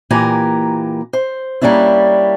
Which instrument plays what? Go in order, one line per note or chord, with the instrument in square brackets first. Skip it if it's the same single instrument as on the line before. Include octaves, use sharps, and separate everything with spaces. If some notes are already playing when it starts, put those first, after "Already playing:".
[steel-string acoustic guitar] A#2 E3 A#3 G4 G#5 A#5
C5
G3 A#3 C#4 D4 E4